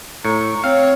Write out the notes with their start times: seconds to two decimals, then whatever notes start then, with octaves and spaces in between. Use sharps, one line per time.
0.25 A2 A#5 C#6
0.64 C4 C#5 F5